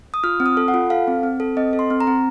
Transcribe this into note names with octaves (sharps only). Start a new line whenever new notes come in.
D#6
F4 F6
C4
D#6
A4
F#5
F4
A4 F5
C4
C4
A4
C4 D#5
A4
C6
C4
A#5
C4